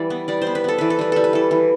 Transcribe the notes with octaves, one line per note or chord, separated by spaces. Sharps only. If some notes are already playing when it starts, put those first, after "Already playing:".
Already playing: E3 G3 D5
B3
G3 D5
B3 C5
B4
B3 A4
E3 B4
A4
G3 B4
G3 A4
B4
E3 A4
E3